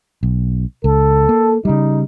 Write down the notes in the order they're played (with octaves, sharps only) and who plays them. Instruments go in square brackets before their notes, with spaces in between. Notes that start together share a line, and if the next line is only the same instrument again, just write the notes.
[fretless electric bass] B1
[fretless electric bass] C#2 [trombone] A4
[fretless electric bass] A#3
[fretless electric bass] C#3 G3 [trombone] D#4